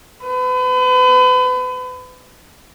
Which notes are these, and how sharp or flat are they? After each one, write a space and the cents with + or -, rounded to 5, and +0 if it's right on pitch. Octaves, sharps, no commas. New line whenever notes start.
B4 +35